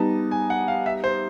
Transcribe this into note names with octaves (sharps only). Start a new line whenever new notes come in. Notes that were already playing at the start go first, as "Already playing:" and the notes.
Already playing: G3 B3 D#4 A5
G#5
F#5
F5
E5
C5